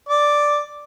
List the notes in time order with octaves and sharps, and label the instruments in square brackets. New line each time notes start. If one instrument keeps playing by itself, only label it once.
[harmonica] D5 D6